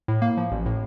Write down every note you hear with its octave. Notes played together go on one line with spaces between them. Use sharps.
A2
A#3
F3
A1
A2